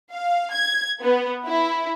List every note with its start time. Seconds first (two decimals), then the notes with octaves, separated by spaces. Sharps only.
0.13 F5
0.54 G#6
1.01 B3
1.45 E4